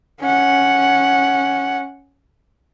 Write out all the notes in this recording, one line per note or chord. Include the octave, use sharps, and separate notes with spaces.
C#4 F#5